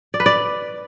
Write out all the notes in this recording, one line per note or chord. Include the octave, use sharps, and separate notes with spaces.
D5
B4
D5